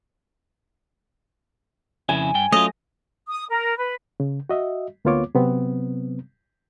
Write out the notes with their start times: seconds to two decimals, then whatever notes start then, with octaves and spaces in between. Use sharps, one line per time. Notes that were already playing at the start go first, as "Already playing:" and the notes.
2.09 F2 C#3 E4 G#5
2.35 G2 G5
2.52 F#3 A3 C#4 F4 D#5
3.29 D#6
3.50 A#4
3.78 B4
4.20 C#3
4.49 F#4 D#5 E5
5.05 D2 A#3 B3 F4 C#5 D6
5.35 C3 F#3 B3 C4